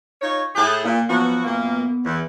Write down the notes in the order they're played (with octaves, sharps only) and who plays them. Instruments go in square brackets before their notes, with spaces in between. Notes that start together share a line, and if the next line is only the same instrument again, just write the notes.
[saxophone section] D#4 F4 C#5
[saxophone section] A2 G#4 [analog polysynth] A5 F#6 G6
[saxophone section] A#2 [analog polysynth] A#3
[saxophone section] F3 F#3 F#4 [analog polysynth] B3
[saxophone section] F#2 A#2 A#3
E2